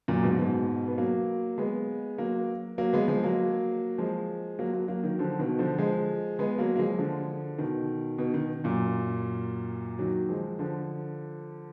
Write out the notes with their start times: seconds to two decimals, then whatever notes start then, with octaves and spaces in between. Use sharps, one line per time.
0.08 F#2 A#2
0.23 G#2 B2
0.38 G#2 B2
0.88 B3
0.98 F#3 A#3
1.58 G#3 B3
2.18 F#3 A#3
2.78 F#3 A#3
2.93 G#3 B3
3.08 F3 G#3
3.24 F#3 A#3
3.98 F3 G#3
4.59 F#3 A#3
4.73 F#3 A#3
4.88 F#3 A#3
5.03 D#3 F#3
5.19 D3 F3
5.39 B2 D#3
5.59 D3 F3
5.78 F3 G#3
6.39 G#3 B3
6.58 F#3 A#3
6.76 A#3
6.78 F3 G#3
6.99 D3 F3
7.58 B2 D#3
8.18 B2 D#3
8.34 B2 D#3
8.64 F#2 A#2
9.99 D#3 F#3
10.29 F3 G#3
10.59 D3 F3